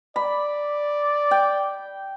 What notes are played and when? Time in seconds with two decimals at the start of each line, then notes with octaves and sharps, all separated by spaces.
0.16 D5 B5
1.31 G5